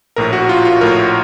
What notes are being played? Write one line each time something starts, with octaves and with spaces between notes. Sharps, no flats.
A#1 A2 A#4
F#4
F4
F4
A#1 A2 A#4